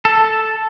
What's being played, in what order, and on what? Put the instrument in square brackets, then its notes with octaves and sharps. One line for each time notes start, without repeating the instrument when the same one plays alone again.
[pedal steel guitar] A4